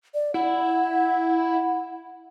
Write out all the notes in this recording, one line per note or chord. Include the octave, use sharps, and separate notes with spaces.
D5
E4 F#5